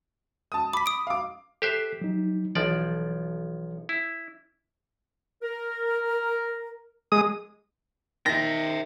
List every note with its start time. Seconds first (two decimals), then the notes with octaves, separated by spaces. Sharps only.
0.52 A5 D#6
0.73 B5 D6 B6
0.86 D#6 D7
1.07 F5 D6
1.62 G4 A4 C5 E5 F#6 C7
2.01 F#3 D#4
2.55 B1 E3 F3 D5
3.89 E4
5.42 A#4
7.12 G#3 D#6
8.26 D#3 E5 G5 A#6